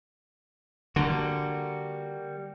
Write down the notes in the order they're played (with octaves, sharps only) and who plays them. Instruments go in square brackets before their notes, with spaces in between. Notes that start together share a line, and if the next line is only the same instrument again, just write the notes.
[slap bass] D3 [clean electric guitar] G3 A#3 F#4